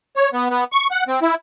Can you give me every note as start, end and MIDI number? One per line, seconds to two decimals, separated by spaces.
0.16 0.29 73
0.33 0.48 59
0.50 0.64 59
0.72 0.87 85
0.91 1.04 78
1.08 1.20 60
1.22 1.35 64